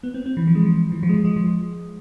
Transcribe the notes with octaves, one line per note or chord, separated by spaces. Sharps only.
B3
C4
C4
E3
F3
G#3
F3
E3
F3
G#3
F3
G#3
F3